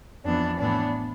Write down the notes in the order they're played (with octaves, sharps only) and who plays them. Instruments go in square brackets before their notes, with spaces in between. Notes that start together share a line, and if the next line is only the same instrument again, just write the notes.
[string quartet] F2 E3 B3 D4
A2 E3 B3 D4